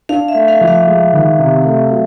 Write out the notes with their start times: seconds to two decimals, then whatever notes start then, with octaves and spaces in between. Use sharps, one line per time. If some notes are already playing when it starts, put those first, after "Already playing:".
0.09 D4 F5
0.28 E5
0.34 A3
0.48 F5
0.61 F3
0.68 F5
0.87 G#3
1.13 D#3
1.39 C3
1.65 A3
1.91 F#3